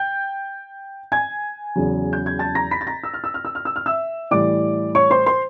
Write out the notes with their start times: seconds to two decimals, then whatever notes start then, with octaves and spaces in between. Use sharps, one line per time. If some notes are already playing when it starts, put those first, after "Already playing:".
Already playing: G5 G6
1.12 G#5 G#6
1.76 E2 C#3 F#3
2.13 G6
2.26 G#6
2.39 A5 A6
2.55 A#5 A#6
2.71 B5 B6
2.81 A6
2.87 A#5 A#6
3.03 E6
3.14 F6
3.24 E6
3.34 F6
3.45 E6
3.55 F6
3.65 E6
3.76 F6
3.86 E5 E6
4.31 A2 E3 G3 D5 D6
4.95 C#5 C#6
5.10 C5 C6
5.26 C5 C6